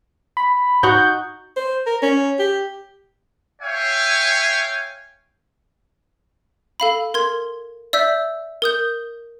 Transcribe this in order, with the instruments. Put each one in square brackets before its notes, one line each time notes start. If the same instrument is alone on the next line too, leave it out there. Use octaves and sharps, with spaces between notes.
[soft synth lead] B5
[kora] D#4 F#4 F#5 [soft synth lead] G6
[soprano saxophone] C5
A#4
C#4
G4
[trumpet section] C#5 E5 F5 G5 G#5
[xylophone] A4 F5 B5
A#4 C6 G#6
D5 E5 E6 G6 B6
A#4 D#6 G6